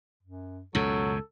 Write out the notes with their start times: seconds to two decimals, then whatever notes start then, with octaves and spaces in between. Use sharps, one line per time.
0.23 F#2
0.75 C#2 F#2 B2 F#3 A4